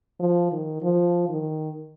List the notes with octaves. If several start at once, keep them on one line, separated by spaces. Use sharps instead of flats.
F3
D#3
F3
D#3